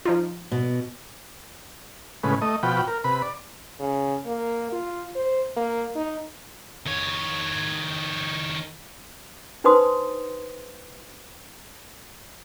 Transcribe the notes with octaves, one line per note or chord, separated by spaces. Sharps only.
F3 D#4 F4
B2
A2 C#3 G#3 B4
A3 D#5
B2 F3 F#4 G5 B5
A#4
C3 B4 B5
D5
C#3
A#3
F4
C5
A#3
D#4
D#3 C#5
D4 D#4 B4 C5 C6 D#6